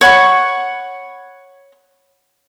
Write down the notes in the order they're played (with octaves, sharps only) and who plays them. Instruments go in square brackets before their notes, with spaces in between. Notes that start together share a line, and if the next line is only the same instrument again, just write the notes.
[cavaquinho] C#5 F#5 B5 C#6